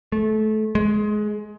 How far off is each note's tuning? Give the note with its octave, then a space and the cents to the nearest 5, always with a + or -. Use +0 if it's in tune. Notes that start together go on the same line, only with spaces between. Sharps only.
A3 -25
G#3 +20